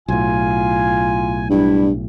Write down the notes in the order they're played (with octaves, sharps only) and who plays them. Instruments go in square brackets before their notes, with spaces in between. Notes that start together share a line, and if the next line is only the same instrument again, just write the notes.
[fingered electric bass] B1 A2 [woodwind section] F4 G#5
[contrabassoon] G2 [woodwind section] G3 E4